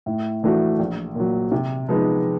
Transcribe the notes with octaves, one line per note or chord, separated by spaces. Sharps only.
A2
E3 A3 D4 F#4
A#1
A#2 F#3
C3
F3 G#3 B3 D#4